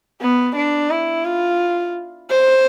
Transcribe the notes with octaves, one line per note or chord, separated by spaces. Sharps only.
B3
D4
E4
F4
C5